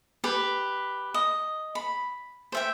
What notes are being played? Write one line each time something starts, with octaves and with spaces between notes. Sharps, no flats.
G4 B4
D#5
B5
C5 E5 G5